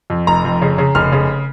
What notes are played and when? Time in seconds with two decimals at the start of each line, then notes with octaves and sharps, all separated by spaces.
0.10 F2
0.27 F1 A#5
0.45 F2
0.62 C#3
0.78 C#3
0.95 F1 F6
1.12 C#3